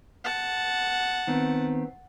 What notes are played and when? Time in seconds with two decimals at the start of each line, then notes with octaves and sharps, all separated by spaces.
0.24 F#5 A5
1.27 D#3 B3 C4